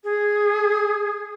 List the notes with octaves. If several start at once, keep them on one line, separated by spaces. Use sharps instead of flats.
G#4